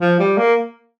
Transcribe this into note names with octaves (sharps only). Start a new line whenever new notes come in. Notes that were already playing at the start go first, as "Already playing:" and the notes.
F3
G3
A#3